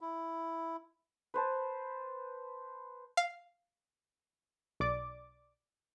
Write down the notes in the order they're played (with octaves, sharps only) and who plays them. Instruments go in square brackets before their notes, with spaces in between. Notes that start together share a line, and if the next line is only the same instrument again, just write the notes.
[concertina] E4
[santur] B4 C5 A5
[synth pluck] F5
[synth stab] B1 D5 D6